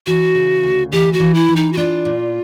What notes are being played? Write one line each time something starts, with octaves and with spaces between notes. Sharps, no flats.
E3 F#4
C#3
D2
E3 G4
F#4
E3
E4
E3
D#4
F#4
D4 F4
A#2